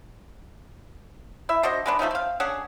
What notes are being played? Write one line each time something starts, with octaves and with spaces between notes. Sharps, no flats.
E4 E5
D4 F#4 C5 D#5
G#3 B3 D4
F3 A3 C#4 D#4
C4 F5
C#4 D4 G#4 F#5